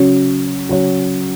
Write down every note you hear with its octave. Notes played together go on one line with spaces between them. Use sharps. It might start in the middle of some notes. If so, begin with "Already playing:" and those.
Already playing: C#3 F#3 C#4 F#4 C#5
C#3 F#3 C#4 F#4 C#5